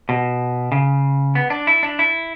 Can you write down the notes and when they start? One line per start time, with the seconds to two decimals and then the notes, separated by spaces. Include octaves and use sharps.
0.09 B2
0.72 C#3
1.35 B3
1.50 D4
1.67 E4
1.83 D4
1.99 E4